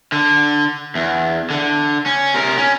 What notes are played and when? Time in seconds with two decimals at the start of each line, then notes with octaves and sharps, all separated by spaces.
0.12 D3
0.95 E2
1.50 D3
2.06 C#4
2.34 C3 A#4
2.58 C#4